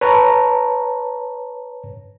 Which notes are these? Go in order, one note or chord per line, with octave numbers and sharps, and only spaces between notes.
B4 C#5 A5 A#5